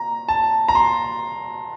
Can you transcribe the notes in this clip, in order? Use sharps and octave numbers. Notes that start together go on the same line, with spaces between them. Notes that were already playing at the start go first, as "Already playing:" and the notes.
Already playing: A#5
A5
A#5
C6